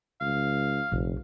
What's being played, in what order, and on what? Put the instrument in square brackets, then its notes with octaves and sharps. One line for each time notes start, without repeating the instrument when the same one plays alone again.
[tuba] C#2 [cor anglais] F5
[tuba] F1 [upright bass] A#1